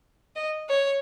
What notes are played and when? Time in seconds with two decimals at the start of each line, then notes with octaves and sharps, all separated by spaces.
0.36 D#5
0.69 C#5